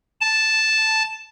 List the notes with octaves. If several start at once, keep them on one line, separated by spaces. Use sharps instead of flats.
A5